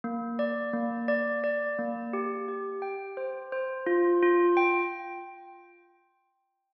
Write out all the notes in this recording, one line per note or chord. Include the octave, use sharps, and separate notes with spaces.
A#3
D5
A#3
D5
D5
A#3
G4
G4
G5
C5
C5
F4
F4
G5